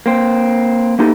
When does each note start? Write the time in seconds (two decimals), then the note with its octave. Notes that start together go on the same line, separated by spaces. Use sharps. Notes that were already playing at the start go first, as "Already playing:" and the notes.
0.06 A#3 C4
0.99 A#3 B3 D#4 E4 G4 A4